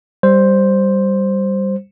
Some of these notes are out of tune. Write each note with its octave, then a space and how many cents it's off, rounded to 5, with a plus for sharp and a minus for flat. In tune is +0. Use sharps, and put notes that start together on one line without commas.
G3 +0 C5 +5